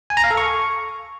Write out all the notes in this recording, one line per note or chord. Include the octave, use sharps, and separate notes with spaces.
G#5
A#5
F5
A4
C#6